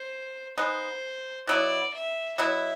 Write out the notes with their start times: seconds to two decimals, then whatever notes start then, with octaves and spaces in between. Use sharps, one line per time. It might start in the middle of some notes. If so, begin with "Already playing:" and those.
Already playing: C5
0.57 G#3 B3 D#4 C5
1.47 B2 F#3 B3 E4 D5
1.94 E5
2.38 B2 F#3 B3 E4 E5